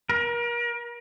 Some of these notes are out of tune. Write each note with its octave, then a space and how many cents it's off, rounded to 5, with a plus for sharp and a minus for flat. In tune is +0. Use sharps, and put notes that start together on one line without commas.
A#4 +35